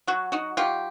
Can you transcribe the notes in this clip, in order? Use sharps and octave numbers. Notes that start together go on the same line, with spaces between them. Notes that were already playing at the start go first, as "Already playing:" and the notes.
F#3 F#4
D#4 F#4
F#3 F4 G4